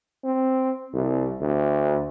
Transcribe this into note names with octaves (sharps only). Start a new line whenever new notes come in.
C4
C2
D2